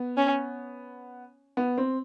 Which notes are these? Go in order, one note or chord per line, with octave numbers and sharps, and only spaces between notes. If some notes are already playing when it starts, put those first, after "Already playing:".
Already playing: B3
C#4
B3
C4